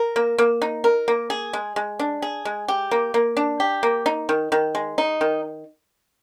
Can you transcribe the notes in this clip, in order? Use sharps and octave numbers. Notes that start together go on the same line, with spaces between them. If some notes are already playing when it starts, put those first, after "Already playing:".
Already playing: A#4
A#3
A#3
D#4
A#4
A#3
G#4
G#3
G#3
D4
G#4
G#3
G4
A#3
A#3
D4
G4
A#3
D#4
D#3
D#3
G#3
D#4
D#3